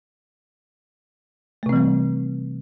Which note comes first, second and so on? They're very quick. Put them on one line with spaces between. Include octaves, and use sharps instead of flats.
A3 C3 C4 E3 G3